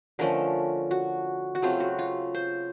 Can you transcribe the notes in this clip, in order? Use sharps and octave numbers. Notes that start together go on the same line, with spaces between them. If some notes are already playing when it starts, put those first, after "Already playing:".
D3 F3 A3 C#4 A#4
F#4
F#4
C#3 F#3 A3 C4 F4
F#4
F4
C5